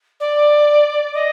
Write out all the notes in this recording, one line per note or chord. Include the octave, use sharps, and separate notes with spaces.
D5
D#5